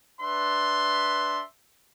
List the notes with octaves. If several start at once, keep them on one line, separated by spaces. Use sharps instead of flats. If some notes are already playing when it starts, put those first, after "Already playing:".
D4 B4 E5 C6